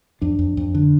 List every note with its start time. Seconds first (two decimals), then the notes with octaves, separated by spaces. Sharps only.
0.22 F2 D4
0.39 F2
0.57 F2
0.75 D3